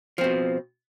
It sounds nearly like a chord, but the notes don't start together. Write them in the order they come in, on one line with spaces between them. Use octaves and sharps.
F3 C4 B2